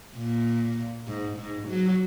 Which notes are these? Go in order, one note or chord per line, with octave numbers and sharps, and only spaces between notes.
A#2
G#2
G#2
F#3